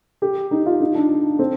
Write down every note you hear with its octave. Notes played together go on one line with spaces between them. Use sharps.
G4
D#4
F4
D#4
D4
C4